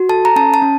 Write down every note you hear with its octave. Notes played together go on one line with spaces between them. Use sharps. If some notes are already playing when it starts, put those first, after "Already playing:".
Already playing: F#4
A4 A5
A#5
C#4 A5
A5
C#4